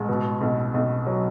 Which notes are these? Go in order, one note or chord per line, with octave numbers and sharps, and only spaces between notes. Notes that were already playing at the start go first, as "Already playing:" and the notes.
Already playing: A1 G#3
B2
B1
B1
F#3